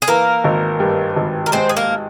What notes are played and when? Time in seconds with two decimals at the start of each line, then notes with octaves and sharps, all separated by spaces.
0.02 G#4
0.08 E3 A#3 A#4
0.44 G#1
0.80 G2
1.16 G#1
1.46 A#4
1.52 G#3 C4 C5
1.69 G#4
1.77 A#3 A#4